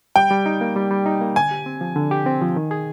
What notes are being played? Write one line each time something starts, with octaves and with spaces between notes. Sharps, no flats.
G3 G5
G3
D#4
A#3
G3
G3
D#4
A#3
D3 G#5
G4
C4
F3
D3
G4
C4
F3
D#3
G#4